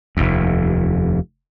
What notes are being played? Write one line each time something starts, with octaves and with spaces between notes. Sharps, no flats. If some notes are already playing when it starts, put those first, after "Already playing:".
F1 D#2